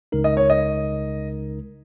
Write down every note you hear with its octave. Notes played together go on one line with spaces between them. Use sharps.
C#2 C#3 G#3 D#4 A#4
D#5
C#5
D#5